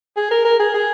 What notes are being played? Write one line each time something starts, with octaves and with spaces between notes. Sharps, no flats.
G#4
A#4
A#4
G#4
G#4